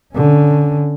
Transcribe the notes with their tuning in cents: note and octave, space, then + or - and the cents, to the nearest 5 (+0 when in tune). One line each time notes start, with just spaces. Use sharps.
D3 -5 C#4 +5